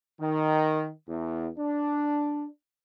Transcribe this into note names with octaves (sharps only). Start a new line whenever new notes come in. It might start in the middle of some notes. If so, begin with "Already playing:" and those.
D#3
E2
D4